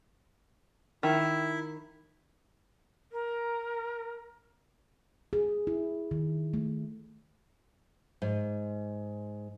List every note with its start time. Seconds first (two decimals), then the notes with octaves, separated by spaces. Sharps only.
1.03 D#3 E4 E5
3.12 A#4
5.33 G#4
5.67 E4
6.11 D#3
6.54 A3
8.22 G#2